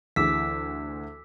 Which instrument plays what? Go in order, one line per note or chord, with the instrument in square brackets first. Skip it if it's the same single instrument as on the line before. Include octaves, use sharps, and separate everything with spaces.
[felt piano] D2 E3 G#4 [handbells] D6 E6 B6